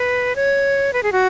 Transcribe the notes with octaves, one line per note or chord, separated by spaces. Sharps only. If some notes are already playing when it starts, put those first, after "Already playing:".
Already playing: B4
C#5
B4
G#4
F#4